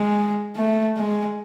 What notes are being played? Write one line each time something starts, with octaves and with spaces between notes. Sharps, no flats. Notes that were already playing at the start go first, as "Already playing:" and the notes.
Already playing: G#3
A3
G#3